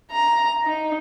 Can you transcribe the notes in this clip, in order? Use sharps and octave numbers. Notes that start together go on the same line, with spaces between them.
A#5
D#4